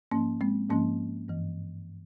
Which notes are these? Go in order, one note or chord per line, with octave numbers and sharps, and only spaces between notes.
G#2 F3 A#3 C#4
G#3 C4
G#2 F3 A#3 C#4
G2 E3